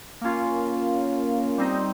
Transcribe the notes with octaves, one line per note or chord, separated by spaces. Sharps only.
A#3 C#4 F4
G3 C4 D#4